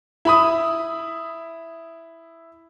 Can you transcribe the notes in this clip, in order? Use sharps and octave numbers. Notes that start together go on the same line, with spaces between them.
E4 B5 D#6